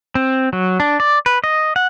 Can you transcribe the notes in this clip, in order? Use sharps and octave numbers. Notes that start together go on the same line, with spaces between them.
C4
F#3
D4
D5
B4
D#5
F#5